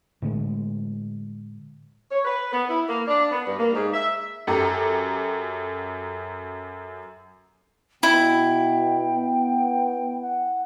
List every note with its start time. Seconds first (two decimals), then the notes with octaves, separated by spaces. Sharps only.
0.22 A2 D3 G#3
2.10 C#5
2.25 B4
2.52 B3
2.67 E4
2.87 A#3
3.08 D4
3.31 B3
3.46 G2
3.59 A#3
3.73 G#2
3.94 E5
4.47 F#2 G4 A4 A#5
8.03 B2 E4 G5
9.16 B3
10.22 F#5